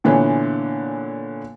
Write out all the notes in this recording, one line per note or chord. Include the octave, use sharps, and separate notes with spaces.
A#2 D3 E3 B3 C#4